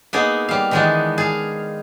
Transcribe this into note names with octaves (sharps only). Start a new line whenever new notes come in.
A#3 B3 D#4 G#4 A#4
G3 F5
D#3 E3 G#3 B3 D4 D#4
G#4 F5